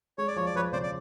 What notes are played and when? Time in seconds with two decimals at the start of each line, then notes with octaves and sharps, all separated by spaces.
0.18 G#3 C#5
0.28 D5
0.36 F3 C#5
0.46 D5
0.55 F3 B4 C#5
0.72 C#3 C5 D5
0.83 D5